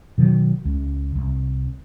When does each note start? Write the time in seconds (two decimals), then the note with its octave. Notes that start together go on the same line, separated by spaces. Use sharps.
0.18 B2 D#3 E3 F#3
0.65 C#2
1.15 C2